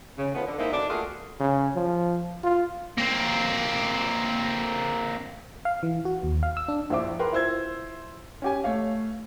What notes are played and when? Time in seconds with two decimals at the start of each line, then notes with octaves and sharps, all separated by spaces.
0.18 C#3
0.34 A2 D#3 F3 B3
0.46 D3
0.58 G#3 A#3 C4 D#4 E4
0.72 B2 D3 D4
0.89 A3 A#3 F4 F#4 G#4
1.40 C#3
1.75 F3
2.44 F4
2.98 A#3 C4
5.65 F5
5.83 E3
6.05 F#4
6.23 D#2
6.43 F5
6.57 E6
6.68 D4
6.90 A#1 E4 C5 E5 D6
7.19 G#4 A#4 B4 G5 C6
7.33 E4 F4 C5 E6 G#6
8.42 C#4 G4 G#5
8.64 A3 C#5 F5